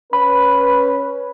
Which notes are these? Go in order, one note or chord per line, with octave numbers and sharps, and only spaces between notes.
C#4 B4 B5